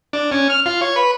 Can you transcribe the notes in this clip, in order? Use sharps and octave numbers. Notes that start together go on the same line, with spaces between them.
D4
C#4
F6
F4
C#5
B4